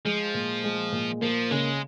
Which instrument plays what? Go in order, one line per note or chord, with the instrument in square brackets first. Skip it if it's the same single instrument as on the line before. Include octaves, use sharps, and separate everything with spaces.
[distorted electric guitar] F3 [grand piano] G#3
[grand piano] A#2
G#3
A#2
[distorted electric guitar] F3 [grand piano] A#3
[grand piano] C#3 [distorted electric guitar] G#3